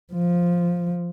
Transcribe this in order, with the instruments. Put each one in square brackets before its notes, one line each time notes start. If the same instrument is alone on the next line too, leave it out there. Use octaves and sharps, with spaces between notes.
[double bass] F3